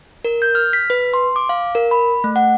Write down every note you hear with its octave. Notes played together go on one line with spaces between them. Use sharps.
A#4
G6
F6
B6
B4
C6
D6
F5
A#4
B5
A3
F#5